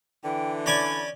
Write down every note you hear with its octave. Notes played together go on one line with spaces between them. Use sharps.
D3 E3 G5
C#4 D5 G#5 B5